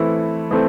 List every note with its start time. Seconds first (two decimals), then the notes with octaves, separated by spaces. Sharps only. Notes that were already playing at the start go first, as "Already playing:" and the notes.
Already playing: E3 A3 C4 E4 A4
0.51 E3 A3 C4